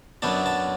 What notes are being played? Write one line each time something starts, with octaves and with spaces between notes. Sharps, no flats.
F#2 F#3 B3 D4 A5
A5